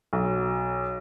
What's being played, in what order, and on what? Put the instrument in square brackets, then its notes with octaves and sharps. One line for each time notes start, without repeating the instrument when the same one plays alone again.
[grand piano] B1